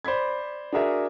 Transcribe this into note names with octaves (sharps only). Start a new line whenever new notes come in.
C5 D5 B5 G#6
D4 F#4 G#4 A#4 E5